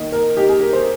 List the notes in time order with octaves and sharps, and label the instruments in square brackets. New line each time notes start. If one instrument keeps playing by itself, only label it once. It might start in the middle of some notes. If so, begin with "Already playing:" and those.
Already playing: [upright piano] D#3 A#3 D#4
A#4
D#3 A#3 D#4 G4
G#4
A#4
C5